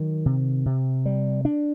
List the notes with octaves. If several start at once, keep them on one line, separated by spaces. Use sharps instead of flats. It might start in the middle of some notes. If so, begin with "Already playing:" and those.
Already playing: D#3 F#3
C3
C3
G3
D4